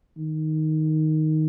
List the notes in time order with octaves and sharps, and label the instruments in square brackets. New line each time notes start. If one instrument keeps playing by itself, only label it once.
[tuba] D#3